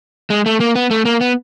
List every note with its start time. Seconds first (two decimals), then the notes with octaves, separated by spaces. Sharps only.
0.30 G#3
0.46 A3
0.60 A#3
0.76 B3
0.91 A3
1.05 A#3
1.21 B3